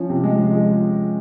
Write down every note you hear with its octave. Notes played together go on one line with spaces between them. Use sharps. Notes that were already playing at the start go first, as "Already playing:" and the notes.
Already playing: F3 C#4
C3
G#3
F3
G#3